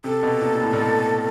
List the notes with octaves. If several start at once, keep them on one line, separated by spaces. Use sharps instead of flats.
C3 A4
B2
A#2
A#2
A2
A#2
B2